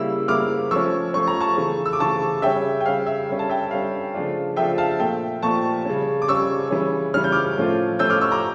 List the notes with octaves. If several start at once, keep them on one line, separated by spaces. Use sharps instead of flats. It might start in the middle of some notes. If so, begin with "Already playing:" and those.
Already playing: C#3 G3 A#3 E4 E6
C#3 G3 A#3 E4 D6 F6
F3 A3 C#4 C#6 E6
F3 A3 C#4 C#6
A#5
A5 C#6
C#3 E3 A3
E6
D6
C#3 E3 A3 A5 C#6
C#3 G3 C#4 E5 G5
G5
C#3 G3 C#4 F5
E5
D3 G3 C#4
A5
E5 G5
D3 G3 C#4 F5
C#3 F3 A3 D4 F4
C#3 F3 A3 D4 F4 E5 G5
F5 A5
A#2 F3 A3 E5 G5
A#2 F3 A3 A5 C#6
C#3 G3 C#4
D6
C#3 G3 C#4 C#6 E6
C#3 E3 G3 C#4
C#3 E3 G3 C#4 F6
G6
D6 F6
A2 F3 A3 C#4 F4
A2 F3 A3 C#4 F4 E6 G6
D6 F6
C#6 E6
A#5 D6